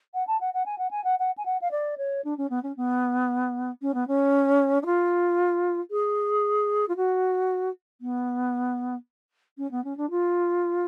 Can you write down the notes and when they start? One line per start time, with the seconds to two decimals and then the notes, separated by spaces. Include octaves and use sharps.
0.14 F#5
0.27 A5
0.40 F#5
0.54 F#5
0.65 G#5
0.78 F#5
0.91 G#5
1.04 F#5
1.19 F#5
1.37 G#5
1.45 F#5
1.61 F5
1.71 D5
1.97 C#5
2.24 D4
2.37 C#4
2.50 B3
2.63 C#4
2.77 B3
3.82 C#4
3.94 B3
4.07 C#4
4.82 D4
4.85 F4
5.91 G#4
6.88 F4
6.96 F#4
8.01 B3
9.58 C#4
9.71 B3
9.84 C#4
9.97 D4
10.10 F4